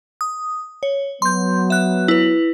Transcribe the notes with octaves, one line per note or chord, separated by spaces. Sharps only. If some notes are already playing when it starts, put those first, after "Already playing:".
D#6
C#5
F#3 B3 C6 G6
E5 F#6
E4 B4